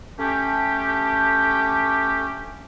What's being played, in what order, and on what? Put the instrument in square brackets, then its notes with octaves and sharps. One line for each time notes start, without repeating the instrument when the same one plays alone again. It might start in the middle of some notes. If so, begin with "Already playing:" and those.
[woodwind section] A3 C#4 D4 G4